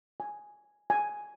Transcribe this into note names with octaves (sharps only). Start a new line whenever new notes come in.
G#5
G#5